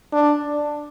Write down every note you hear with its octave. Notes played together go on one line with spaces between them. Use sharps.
D4